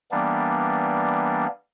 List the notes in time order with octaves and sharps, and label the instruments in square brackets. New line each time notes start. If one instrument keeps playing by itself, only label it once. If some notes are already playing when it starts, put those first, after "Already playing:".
[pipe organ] E3 G3 A#3 B3 D4